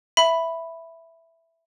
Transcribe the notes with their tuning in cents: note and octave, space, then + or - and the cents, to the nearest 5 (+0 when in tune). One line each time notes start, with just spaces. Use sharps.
E5 +0 B5 +0